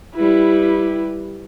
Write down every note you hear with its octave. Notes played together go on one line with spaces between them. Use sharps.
G3 E4 G4 B4